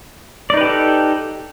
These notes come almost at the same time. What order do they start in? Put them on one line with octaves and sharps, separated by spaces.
D5 D#4 B4 G4 A4